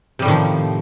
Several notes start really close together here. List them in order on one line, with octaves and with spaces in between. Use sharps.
C3 G3 A2 D#3 F3